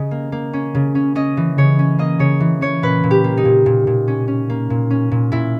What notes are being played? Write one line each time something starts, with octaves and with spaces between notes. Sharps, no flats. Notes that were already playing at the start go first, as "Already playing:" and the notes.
Already playing: C#3 D#5
A#3
A#3
C#4
C#3
C#4
C#4 D#5
E3
C#3 C#5
C#4
A#3 D#5
C#3 C#5
E3
C#4 C#5
A#2 B4
A#2
G4
A#3
D#4
A#2
A#2
A#2
C#4
C#4
A#3
A#2
C#4
A#2
A#2 E4